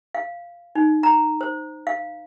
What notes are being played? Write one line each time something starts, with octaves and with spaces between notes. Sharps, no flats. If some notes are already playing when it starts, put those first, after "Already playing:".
F5
D#4
A#5
C5
F5